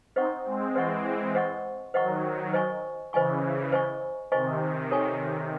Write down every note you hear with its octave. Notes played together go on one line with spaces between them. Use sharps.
C4 D#4 C5 D#5 F#5 C#6
G#3 C4
E3 G#3 C5 D#5 F#5 C#6
C5 D#5 F#5 C#6
D#3 F#3 C5 D#5 F#5 C#6
C5 D#5 G#5 C#6
C#3 E3 C5 D#5 G#5 C#6
C5 D#5 G#5 C#6
C3 D#3 C5 D#5 G#5 C#6
A4 C#5 G#5 C#6